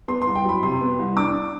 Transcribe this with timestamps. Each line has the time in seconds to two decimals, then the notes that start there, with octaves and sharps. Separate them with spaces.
0.08 B3 C6
0.22 C6
0.27 C2
0.35 G5
0.45 F#3 B5
0.63 C3 C6
0.81 B3
0.99 C2
1.17 D4 D6